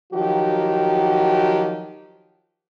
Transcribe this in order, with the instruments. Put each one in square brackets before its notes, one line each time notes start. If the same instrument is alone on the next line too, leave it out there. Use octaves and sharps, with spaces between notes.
[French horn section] D#3 F3 F#3 F#4 G4